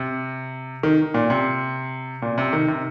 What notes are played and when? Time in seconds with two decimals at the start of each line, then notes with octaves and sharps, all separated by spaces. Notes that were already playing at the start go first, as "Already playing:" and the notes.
Already playing: C3
0.83 D#3
1.14 A#2
1.30 C3
2.22 A#2
2.38 C3
2.53 D#3
2.68 C3